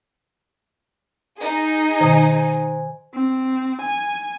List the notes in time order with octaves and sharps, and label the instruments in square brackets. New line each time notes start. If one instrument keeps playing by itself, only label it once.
[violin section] D#4 G#4
[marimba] B2 D#3 [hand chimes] C5 G#5
[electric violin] C4
G#5